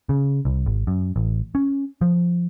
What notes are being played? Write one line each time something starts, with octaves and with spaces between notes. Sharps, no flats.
C#3
C2
G#1
F#2
A1
C#4
F3